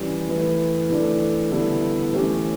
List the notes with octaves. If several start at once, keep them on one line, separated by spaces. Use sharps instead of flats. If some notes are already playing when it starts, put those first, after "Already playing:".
Already playing: E3 G3 C#4
E3 A3 E4 B4
E3 A3 D4 A4
D3 G3 B3 E4 A4
E3 A3 C#4 E4 G4